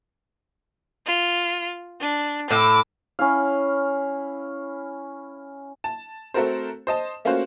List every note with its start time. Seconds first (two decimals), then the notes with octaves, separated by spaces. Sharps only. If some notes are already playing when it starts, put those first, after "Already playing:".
1.06 F4
2.01 D4
2.51 A2 D6 E6
3.19 C#4 E4 F5
5.84 A5
6.34 A3 C4 F#4 A4 A#4 C5
6.87 C5 D#5 A5
7.25 A3 A#3 C#4 F4 F#4 C5